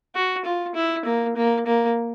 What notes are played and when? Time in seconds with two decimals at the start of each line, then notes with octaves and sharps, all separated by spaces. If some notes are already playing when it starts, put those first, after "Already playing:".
0.15 F#4
0.45 F4
0.75 E4
1.05 A#3
1.37 A#3
1.66 A#3